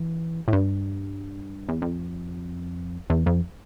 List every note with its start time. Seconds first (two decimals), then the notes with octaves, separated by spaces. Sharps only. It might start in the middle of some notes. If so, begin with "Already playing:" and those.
Already playing: E3
0.48 A2
0.53 G2
1.69 E2
1.82 F2
3.10 E2
3.26 F2